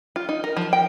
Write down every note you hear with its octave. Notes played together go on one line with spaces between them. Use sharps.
F4
D#4
A#4
F3
G5